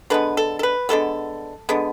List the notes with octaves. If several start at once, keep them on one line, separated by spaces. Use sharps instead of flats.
D3 G#3 B3 B4
A4
A4
B4
D3 G#3 B3 A4
D3 G#3 B3